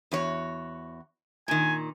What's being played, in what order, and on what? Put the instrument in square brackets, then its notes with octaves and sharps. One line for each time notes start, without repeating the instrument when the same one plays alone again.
[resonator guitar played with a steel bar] E2 F#4 C#5
[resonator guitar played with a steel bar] A#2 D#3 [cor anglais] G#5